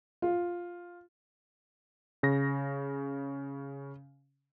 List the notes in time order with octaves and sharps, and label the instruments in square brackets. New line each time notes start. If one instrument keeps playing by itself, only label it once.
[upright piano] F4
[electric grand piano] C#3 A#6